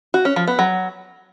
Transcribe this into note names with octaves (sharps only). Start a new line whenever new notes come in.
F#4
C#4
F3
B3
F#3